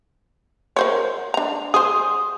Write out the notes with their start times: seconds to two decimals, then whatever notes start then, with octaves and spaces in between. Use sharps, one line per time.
0.76 A#4 C5 C#5
1.34 D4 A#5
1.74 G#4 C5 D#6